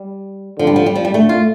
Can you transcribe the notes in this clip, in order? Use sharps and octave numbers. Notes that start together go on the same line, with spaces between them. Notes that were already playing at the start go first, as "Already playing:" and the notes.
Already playing: G3
D3 F3
G3
F3
G3
F3
G3
D3 A3
F4